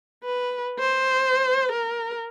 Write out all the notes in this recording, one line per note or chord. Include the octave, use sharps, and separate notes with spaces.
B4
C5
A#4